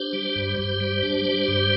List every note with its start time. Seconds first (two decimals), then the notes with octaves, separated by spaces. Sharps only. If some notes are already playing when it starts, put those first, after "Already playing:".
Already playing: D4 G4 C5
0.13 G3
0.36 G2
0.59 G2
0.80 G3
1.03 D4
1.26 G3
1.48 G2